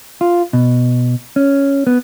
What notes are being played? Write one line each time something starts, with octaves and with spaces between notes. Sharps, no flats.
F4
B2
C#4
B3